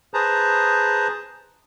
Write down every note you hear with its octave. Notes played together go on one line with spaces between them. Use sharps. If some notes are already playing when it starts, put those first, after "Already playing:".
G#4 B4 C5 A5 A#5